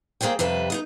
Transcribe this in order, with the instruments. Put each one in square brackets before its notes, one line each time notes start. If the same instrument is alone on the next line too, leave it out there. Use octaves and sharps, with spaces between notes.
[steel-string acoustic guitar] A#3 G#4 C5 D5 G5
F2 C3 G3 B4 E5
D#4 F4 D#5